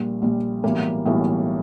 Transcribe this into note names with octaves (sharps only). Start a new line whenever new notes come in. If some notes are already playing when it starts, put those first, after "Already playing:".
Already playing: A#1 A#2 G3
A#1 A#2 G3
B1 A2 E3 G3 A#3
B1 A2 E3 G3 A#3